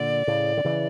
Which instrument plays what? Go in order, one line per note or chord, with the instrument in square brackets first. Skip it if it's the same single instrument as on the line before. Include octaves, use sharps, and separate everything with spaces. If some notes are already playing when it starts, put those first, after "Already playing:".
Already playing: [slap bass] A#2 D3 [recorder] D5
[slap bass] A2 C#3
D3
C#3 E3